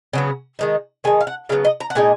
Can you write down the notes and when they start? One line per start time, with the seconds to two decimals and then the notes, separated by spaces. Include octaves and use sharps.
0.13 C#3 F#3 B3
0.59 D#3 G#3 D#4
1.04 D#3 G#3 D#4 G#5
1.21 F5
1.27 F#5
1.49 C#3 F#3 B3 F5
1.65 D#5
1.80 A#5
1.90 F#5
1.95 A#2 G#3 D#4 G#5